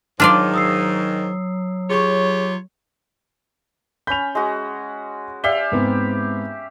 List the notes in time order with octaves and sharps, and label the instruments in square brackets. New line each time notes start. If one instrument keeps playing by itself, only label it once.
[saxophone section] G#2 D#3 [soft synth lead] F#3 [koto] D4 F4 D5 [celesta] C#5 F6
[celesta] D#6 E6 C7
[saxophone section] F4 G4 C#5 [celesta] G#4 C#6
[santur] C#4 B5 [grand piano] G6 F7
[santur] G#3 F#4
[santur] G4 E5 F5 [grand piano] D5 G7
[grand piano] G#2 B3 C4